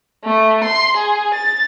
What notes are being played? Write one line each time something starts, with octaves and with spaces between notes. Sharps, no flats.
A3
C6
G#4
A6